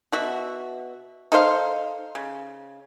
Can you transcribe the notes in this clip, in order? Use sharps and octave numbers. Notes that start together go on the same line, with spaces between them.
B2 F#4 E5
D#4 A4 C5 F5
C#3